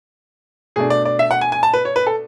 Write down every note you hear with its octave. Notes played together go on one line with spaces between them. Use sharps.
B2 A3 D4 G#4
D5
D5
E5
F#5
G#5
G#5
A5
B4
C#5
B4
A4